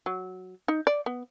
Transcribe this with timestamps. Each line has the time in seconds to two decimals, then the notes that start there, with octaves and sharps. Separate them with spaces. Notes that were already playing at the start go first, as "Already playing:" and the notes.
0.06 F#3
0.68 D#4
0.87 D5
1.06 B3